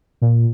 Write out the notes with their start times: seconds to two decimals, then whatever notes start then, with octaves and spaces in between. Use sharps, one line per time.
0.22 A#2